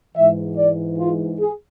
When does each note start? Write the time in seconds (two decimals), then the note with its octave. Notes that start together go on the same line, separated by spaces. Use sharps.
0.15 G#2 E3 E5
0.56 D5
0.99 F4
1.39 G#4